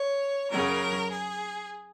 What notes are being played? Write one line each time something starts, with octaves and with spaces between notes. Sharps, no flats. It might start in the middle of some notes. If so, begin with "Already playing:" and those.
Already playing: C#5
F#2 C#3 F#3 A#4
G#4